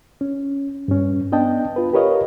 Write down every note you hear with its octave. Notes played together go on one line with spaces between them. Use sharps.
C#4
G2 C#4
B3 D4 D#5 G5 A5
F4 B4
G4 A#4 B4 C#5 D#5 F5